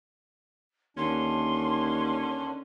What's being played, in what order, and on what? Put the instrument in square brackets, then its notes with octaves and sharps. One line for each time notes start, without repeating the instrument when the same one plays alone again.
[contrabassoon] D#2 [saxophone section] D3 D#3 C#4 [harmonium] D4 [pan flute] C6